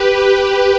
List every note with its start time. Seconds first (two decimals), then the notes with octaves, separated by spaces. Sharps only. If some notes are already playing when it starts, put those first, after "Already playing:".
Already playing: G4 B4
0.27 G4 B4